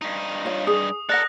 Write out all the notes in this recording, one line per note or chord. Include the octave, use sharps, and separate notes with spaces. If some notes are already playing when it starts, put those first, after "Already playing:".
G2 D#4
F4 C#5 F5
G#4 D#6
A4 A#4 D5 F#5 F#6 A#6